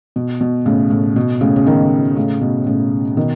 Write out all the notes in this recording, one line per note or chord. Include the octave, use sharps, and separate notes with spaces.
B2
B2
A2 C#3
A2
B2
A2 C#3
C#3
B2 D#3
A2 C#3
B2
A2 C#3
B2 D#3